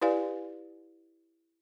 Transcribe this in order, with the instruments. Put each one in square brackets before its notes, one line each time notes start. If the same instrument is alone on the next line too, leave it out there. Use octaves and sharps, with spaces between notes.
[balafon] E4 G4 B4 D5 F5 G#5